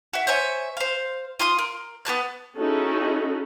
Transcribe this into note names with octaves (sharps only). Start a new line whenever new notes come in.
F#4 E5
C5 C#5 E5 G#5
C5 F5
F4 C6 D#6
A#4
B3 G4 A5 F#6
C#4 D#4 E4 F#4 G#4 A4